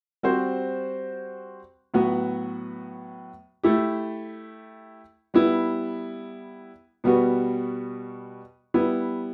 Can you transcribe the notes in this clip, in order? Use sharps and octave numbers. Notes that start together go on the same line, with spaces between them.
G3 C4 F#4 C5
A2 F#3 B3 F#4 B4
A3 E4 G4
G3 B3 E4
B2 G3 B3 F#4
G3 B3 E4